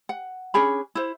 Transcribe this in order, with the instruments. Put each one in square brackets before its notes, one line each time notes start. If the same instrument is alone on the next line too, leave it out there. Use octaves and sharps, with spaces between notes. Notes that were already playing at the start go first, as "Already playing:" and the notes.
[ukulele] F#5
C#4 D4 G#4 B5
E4 C5